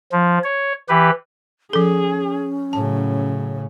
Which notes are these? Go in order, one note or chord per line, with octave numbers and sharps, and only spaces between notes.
F3
C#5
E3 G4 B4
F3 C#4 G#4 A4
A2 C#3 F#3 A5